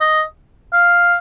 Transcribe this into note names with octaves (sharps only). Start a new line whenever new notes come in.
D#5
F5